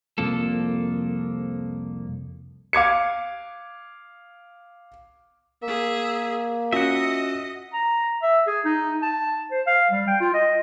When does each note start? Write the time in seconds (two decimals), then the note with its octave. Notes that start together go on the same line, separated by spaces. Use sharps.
0.18 C2 F2 F3 A#3 A4
2.73 F5 D6 G#6 C#7
5.63 A#3 G#4 E5
6.73 C#4 F4 F#4 D#5 E5 F#5
7.73 A#5
8.22 E5
8.47 G#4
8.65 D#4
9.02 A5
9.51 C5
9.67 F5
9.90 G3
10.08 G5
10.21 F4
10.34 D#5